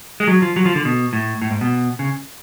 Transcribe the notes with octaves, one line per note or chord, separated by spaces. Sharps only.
G#3
F#3
F3
F#3
F3
D3
B2
A2
A2
G#2
B2
C#3